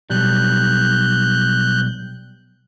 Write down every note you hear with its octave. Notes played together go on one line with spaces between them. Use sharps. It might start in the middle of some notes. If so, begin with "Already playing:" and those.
B1 G3 F#6 G6